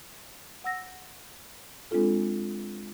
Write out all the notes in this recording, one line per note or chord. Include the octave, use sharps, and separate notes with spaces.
F#5 E6 A#6
G#3 C4 D4 F4 A4